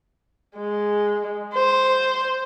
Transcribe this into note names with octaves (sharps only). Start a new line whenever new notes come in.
G#3
C5